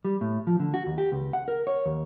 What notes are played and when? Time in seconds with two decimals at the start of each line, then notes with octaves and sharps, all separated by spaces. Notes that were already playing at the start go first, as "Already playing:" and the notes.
0.05 G3
0.21 A2
0.47 F3
0.60 D3
0.74 F#4
0.86 D#2
0.98 G4
1.12 C#2
1.33 F#5
1.48 A#4
1.67 C#5
1.86 D#2